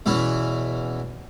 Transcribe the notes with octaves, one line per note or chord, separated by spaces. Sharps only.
E2 B2 E3 C#4